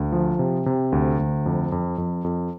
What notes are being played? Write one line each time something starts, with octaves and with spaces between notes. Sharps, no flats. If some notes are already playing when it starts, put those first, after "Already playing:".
Already playing: D2
F3
C3
C3
D2
D2
F2
F2
F2
F2